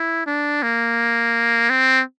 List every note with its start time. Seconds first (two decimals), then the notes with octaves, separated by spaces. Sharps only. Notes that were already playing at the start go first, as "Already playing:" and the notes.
Already playing: E4
0.27 D4
0.63 A#3
1.70 C4